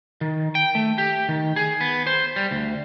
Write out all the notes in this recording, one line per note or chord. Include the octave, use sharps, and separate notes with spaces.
D#3
G5
A3
G4
D#3
G#4
B3
C5
G3
D2